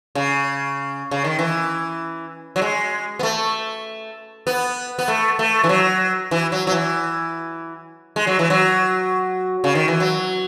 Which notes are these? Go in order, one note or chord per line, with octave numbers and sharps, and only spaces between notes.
C#3
C#3
D#3
E3
F#3
G#3
B3
A3
B3
B3
A3
A3
E3
F#3
E3
F#3
F#3
E3
G#3
F#3
E3
F#3
C#3
D#3
E3
F#3